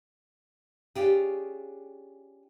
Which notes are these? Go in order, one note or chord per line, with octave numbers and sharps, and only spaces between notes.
C#4 D4 F4 G4 G#4